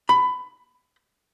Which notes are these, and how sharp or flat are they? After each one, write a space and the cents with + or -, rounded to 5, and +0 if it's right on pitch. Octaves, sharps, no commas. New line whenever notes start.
B5 +20